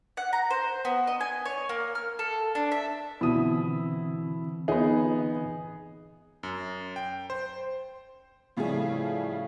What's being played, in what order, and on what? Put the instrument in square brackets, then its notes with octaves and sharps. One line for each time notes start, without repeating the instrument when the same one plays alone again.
[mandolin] F#5
A#5
C5
B3
D#5
G#5
C#5
A#3
F6
A4
D4
E5
[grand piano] B2 D#6 [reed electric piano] D3 E3 C4 [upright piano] E4
[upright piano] B3 D#4 [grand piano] G#4
[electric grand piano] F#2
G5
C5
[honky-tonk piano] A2 C#3 F3 G3 A3 G#4